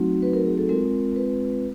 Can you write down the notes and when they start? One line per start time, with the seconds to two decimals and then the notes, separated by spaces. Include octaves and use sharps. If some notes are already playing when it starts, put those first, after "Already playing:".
Already playing: F#3 A3 C4 D#4 F#4
0.22 B4
0.33 A#4
0.46 G#4
0.58 A4
0.69 G#3 C4 F4 A#4
1.16 B4